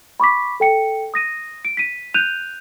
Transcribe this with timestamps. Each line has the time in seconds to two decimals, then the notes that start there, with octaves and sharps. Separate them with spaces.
0.20 B5 C#6 D6 B6
0.60 A4 G5 C#7
1.14 D#6 A#6 D#7
1.65 D7
1.77 B6 D#7
2.14 F#6 G6 D#7 F7